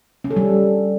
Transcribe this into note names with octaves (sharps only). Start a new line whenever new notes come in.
C#4
A4
G3